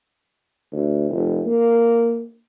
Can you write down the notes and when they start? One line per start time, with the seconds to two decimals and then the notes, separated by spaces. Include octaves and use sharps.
0.72 D2
1.10 F1
1.46 A#3